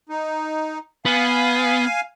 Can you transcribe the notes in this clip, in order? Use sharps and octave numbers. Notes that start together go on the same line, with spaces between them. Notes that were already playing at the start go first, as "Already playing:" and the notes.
D#4
B3 F5 G#5